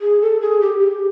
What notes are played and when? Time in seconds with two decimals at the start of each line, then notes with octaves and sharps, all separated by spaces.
0.01 G#4
0.21 A4
0.41 G#4
0.61 G4
0.80 G4